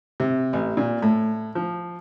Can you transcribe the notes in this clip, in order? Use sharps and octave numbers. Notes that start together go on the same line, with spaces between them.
C3
A1
A#2
A2
F3